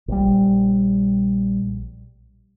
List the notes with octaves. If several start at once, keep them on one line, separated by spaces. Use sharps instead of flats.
A#1 G3